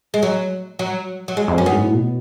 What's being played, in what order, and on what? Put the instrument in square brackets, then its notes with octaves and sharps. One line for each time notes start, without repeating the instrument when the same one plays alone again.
[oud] G#3
F#3
F#3
F#3
G#3
[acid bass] F2
[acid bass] F#2 [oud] C#4
[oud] B3
[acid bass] G#2
A2
B2